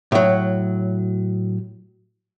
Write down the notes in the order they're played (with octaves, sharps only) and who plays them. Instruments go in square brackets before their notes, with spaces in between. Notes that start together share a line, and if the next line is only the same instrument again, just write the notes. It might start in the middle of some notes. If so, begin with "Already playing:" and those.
[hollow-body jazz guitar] A2 F#3